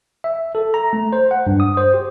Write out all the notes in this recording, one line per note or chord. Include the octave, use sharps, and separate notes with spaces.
E5
A4
A#5
A3
C5
F#5
G2
D#6
C5
G4